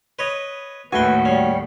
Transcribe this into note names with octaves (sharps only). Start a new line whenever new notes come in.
B4 C#5 D#5
D#2 A2 A3 F#4 B4 G5 G#5
G3 C#4